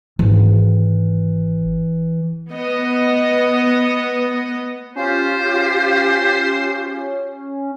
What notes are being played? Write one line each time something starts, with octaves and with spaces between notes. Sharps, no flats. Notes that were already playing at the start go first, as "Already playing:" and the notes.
G#1 E3
B3 D#5
C#4 F4 G4 C5